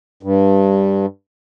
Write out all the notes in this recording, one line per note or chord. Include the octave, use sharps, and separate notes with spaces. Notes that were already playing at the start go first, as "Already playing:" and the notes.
G2